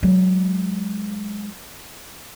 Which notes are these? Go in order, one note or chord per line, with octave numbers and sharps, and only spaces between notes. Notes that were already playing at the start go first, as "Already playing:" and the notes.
F#3 G#3